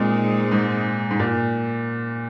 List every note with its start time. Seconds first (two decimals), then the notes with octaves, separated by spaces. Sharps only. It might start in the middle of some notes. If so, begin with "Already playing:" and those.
Already playing: A#2 G#3 C4 D#4
0.51 G#2
1.11 G#2
1.20 A#2